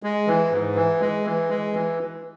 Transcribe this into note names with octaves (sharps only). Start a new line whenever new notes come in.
G#3
E3
G#2
E3
G#3
E3
G#3
E3